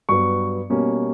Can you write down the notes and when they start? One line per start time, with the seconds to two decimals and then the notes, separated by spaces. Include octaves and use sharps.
0.09 G2 F#3 B3 C#6
0.70 B2 G3 A#3 C#4